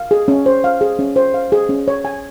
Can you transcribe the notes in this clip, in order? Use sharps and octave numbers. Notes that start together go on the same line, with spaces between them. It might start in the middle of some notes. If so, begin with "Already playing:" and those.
Already playing: F5
G#4
C#4
C5
F5
G#4
C#4
C5
F5
G#4
C#4
C#5
G#5